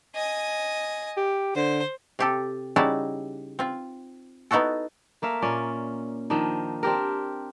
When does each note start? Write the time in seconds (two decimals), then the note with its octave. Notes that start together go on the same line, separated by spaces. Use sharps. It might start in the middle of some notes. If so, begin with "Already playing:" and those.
0.15 D#5 G#5
1.17 G4
1.55 D3 C5
2.19 C3 G4 A4
2.76 C#3 G3 D#4 E4 F#4 A5
3.59 C4 F4
4.51 B3 D#4 E4 F#4 A4
5.22 A3 A#3 E5 F5
5.42 A#2 C#4 D5
6.30 D#3 F3 D4 D#4
6.83 C4 D4 G4 A#4